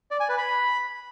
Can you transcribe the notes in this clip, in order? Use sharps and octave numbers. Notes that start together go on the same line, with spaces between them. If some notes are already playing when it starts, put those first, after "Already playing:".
D5
G#5
B4
B5